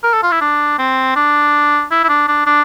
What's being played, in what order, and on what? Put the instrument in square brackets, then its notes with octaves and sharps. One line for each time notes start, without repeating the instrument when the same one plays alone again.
[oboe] A#4
A4
F4
E4
D4
C4
D4
E4
E4
D4
D4
D4